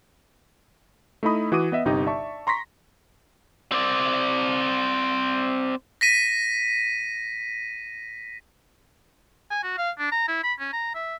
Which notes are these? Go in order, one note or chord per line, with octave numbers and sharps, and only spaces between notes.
A3 D#4 E4 D#5 B5 D#6
E3 F#4 D6 D#6 D#7
B3 D#5 E5
G1 C3 D#4 G4 D#5
D5 E5 A5 C#6
A#5 C6 C#6 A#6 B6
C4 D5
A#6 B6 D#7
G#5
F#4
F5
D4
A#5
E4
B5
C#4
A#5
E5